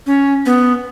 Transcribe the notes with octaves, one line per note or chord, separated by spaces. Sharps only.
C#4
B3